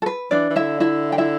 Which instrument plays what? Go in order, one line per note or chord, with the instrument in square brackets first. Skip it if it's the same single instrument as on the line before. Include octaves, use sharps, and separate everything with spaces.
[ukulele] A4
B4
[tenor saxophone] E3 [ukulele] D4 D5
[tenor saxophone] E3
[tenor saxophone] D3 [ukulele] E4 E5
[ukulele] E4 E5
G5
E4 E5